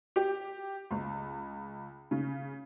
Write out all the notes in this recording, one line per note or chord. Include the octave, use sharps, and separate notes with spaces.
G4
C#2
C#3